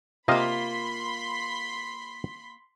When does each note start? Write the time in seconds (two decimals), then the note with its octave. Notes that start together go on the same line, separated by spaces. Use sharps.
0.28 C3 A#3 F4 D#5 F5 B5 C6 B6